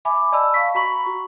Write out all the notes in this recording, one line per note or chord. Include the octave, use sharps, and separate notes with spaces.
E5 G#5 B5 D6
D5 D#5 A5 B5 E6
F5 A5 C#6 B6
F#4 A#5 B5 C#6 F#7
F#4